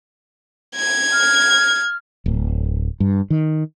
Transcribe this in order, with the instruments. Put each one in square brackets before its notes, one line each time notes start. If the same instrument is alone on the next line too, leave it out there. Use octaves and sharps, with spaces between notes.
[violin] G#6
[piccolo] F6
[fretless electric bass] D1
G2
D#3